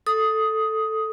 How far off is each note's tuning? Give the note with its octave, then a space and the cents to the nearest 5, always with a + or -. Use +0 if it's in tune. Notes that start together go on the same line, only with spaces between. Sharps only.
A4 +0 D#6 +10